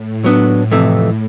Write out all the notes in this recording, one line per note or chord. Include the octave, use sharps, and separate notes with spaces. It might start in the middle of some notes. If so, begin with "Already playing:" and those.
Already playing: A2
F#3 B3 D4
F2 C3 E3 A3